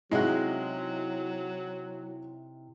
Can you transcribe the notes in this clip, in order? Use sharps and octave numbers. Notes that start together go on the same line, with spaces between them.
C3 F#3 G#3 C#4 D#4 E4 F#4